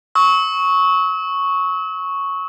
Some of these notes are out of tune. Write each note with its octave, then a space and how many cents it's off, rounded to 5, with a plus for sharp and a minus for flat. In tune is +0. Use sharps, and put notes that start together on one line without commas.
C#6 +0 E6 -45